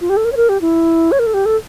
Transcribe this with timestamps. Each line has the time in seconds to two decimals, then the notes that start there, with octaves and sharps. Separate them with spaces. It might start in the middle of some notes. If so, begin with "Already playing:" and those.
0.01 F4
0.09 G4
0.17 A4
0.25 A#4
0.32 C#5
0.37 A#4
0.49 G4
0.61 E4
1.12 C#5
1.19 A#4
1.27 A4
1.34 G4
1.46 A4